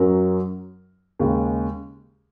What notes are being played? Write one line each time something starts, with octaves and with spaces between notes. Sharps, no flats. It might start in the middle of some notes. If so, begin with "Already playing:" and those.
Already playing: F#2 F#3 C#4 A#4
D#2 C#3 G#3